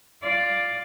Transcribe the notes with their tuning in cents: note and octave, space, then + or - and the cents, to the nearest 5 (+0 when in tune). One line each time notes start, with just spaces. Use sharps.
F4 +0 D5 +0